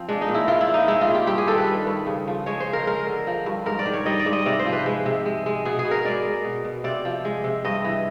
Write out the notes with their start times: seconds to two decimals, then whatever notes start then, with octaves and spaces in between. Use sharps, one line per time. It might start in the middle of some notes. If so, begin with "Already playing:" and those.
Already playing: F3 C4
0.09 G#3 D4
0.21 D#4
0.28 A#2
0.34 E4
0.48 A#2 F4
0.61 E4
0.68 F3
0.74 D#4
0.88 G#3 E4
1.01 F4
1.07 A#2
1.14 G4
1.27 G2 G4
1.38 G#4
1.47 D#3 A4
1.58 B4
1.67 G3
1.87 G2
2.06 C#3
2.27 F3
2.46 G#3 C#5
2.60 C5
2.67 C#3
2.73 A#4
2.87 G#3 A#4
3.07 D3
3.27 F3
3.46 G2
3.66 G#2 A#4
3.79 D5
3.86 D#3
3.93 C#5
4.06 G3 D#5
4.19 D5
4.26 G#2
4.33 D#5
4.46 C3 D5
4.59 C5
4.66 F3
4.73 B4
4.86 G#3
5.06 C3
5.25 G#3
5.46 G#3
5.65 B2 G#4
5.79 G#4
5.85 B2
5.91 A#4
6.05 G#3 D5
6.25 G#3
6.45 B2
6.64 B2
6.84 C3 D5
7.05 F3
7.25 G#3
7.44 C3
7.65 G2 D#5
7.85 E3